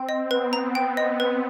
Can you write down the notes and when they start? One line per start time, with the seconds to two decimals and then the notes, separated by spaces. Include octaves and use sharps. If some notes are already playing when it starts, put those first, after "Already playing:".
Already playing: C4 G5
0.09 D#5
0.31 B3 B4
0.53 A#5
0.75 G5
0.97 D#5
1.20 B4